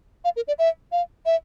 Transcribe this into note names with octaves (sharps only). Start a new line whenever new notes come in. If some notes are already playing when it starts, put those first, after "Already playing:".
F5
A#4
D5
E5
F5
E5